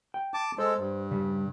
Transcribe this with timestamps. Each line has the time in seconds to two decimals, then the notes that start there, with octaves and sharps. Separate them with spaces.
0.14 G5
0.34 A5 D6
0.58 G#3 A4 C5
0.78 G2
1.11 C#3 G3